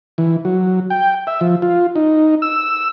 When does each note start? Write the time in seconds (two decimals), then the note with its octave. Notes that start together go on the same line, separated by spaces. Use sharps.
0.18 E3
0.45 F#3
0.90 G5
1.27 E5
1.41 F3
1.62 F4
1.96 D#4
2.42 E6